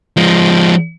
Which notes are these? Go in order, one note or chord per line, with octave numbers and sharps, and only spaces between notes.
F3 G#3